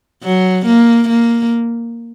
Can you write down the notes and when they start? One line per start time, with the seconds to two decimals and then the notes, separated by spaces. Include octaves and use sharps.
0.23 F#3
0.66 A#3
1.09 A#3